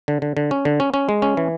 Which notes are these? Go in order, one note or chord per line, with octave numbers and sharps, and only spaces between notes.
D3
D3
D3
C#4
D3
C#4
C#4
G#3
C#4
E3